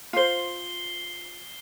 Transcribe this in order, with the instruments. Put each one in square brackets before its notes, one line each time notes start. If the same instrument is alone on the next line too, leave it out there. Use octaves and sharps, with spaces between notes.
[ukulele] F4 C5 [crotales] C7 G7